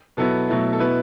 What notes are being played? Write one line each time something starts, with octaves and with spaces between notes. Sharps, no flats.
B2 F#3 B3 E4 A4
B2 F#3 A3 E4
A4
B2 B3 E4 B4